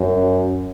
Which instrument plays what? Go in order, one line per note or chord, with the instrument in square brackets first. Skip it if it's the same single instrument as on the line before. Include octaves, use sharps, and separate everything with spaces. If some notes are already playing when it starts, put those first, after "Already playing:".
Already playing: [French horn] F#2